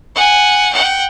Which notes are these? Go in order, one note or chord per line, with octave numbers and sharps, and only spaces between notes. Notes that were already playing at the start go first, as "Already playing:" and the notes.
F#5 G#5
F#5 G5